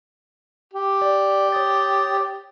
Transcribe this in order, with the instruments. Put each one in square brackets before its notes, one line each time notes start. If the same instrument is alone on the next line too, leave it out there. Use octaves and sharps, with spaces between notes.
[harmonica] G4
[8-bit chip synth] D5
C#5 D#6 A6